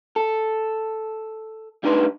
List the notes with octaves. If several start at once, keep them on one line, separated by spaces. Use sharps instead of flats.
A4
D2 G3 D4 D#4 B4 C6